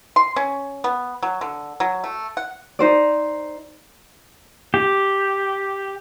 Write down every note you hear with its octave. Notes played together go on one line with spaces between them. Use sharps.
C6
C#4
B3
F#3
D3
F#3
A3
F#5
D#4 C5 D5
G4